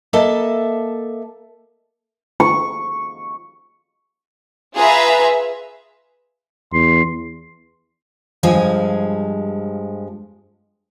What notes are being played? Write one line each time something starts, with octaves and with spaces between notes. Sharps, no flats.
A#3 A4 D#5 E5 A5
C#6
F4 G#4 B4 E5 A#5
E2 C6
G2 F3 G#3 G#5